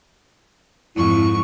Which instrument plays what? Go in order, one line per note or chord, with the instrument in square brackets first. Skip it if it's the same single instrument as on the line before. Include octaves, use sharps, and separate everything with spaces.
[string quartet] F2 G#2 C#6 [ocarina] E4